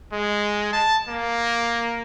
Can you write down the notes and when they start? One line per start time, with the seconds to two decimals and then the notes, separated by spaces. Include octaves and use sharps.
0.13 G#3
0.73 A5
1.09 A#3